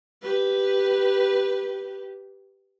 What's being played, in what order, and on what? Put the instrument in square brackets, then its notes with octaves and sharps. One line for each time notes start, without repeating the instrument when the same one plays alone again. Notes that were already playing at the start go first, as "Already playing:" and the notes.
[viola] G4 B4